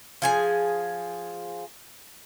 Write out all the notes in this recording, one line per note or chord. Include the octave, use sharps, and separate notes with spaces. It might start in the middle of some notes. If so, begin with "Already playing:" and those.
F3 G#4 G#5